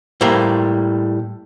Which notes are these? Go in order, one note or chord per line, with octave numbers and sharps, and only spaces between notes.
A2 G3 A#3 C5